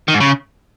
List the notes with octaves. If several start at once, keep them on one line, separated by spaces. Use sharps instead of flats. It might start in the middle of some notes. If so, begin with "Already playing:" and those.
D#3
G#2
C#3